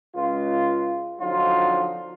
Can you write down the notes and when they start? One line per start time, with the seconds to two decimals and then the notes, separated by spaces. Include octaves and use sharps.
0.15 C#2 F4
1.19 D3 F3 F#3 C4 D#4 F4